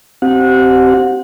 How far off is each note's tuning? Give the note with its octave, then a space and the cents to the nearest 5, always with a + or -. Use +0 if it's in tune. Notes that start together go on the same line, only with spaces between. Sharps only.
C4 +0 G4 -30 F#5 -30